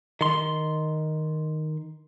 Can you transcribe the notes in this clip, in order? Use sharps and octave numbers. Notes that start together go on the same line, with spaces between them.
D#3 C6